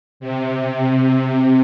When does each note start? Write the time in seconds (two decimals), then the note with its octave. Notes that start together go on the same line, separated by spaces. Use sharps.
0.20 C3
1.10 C3